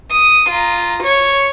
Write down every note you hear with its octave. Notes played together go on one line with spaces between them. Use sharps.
D#6
F4 A#5
C#5